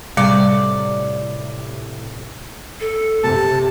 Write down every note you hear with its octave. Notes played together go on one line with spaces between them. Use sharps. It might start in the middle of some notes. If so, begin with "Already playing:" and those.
A2 C3 G3 D5
A4
C3 A5